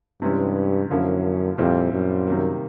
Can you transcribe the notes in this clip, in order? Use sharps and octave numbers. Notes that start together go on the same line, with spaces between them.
G2 C3 E3 G#3 C#4
F#2 D3 F3 A#3 C#4 E4
F2 A#2 G3 C4 E4
F#2
C3 D#3 G3 A#3